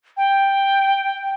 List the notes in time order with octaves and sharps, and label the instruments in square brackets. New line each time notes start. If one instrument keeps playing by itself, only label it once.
[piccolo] G5